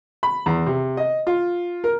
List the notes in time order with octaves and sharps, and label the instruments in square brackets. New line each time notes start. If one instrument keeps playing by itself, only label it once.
[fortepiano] B5
E2
C3
D#5
F4
A#4